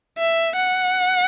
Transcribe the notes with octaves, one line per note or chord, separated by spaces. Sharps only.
E5
F#5